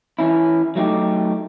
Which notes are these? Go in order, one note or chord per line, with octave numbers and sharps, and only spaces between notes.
E3 C#4 E4
F#3 A3 D#4 G4